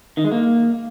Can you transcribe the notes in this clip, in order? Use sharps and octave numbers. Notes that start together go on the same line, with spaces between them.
D#3
G#3
A#3